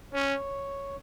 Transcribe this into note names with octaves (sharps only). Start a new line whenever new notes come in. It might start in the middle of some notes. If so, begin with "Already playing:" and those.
C#4 C#5